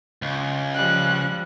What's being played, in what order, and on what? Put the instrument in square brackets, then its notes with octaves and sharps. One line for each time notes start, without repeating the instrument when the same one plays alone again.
[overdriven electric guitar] C#2
[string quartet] F3 G3 [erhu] F#6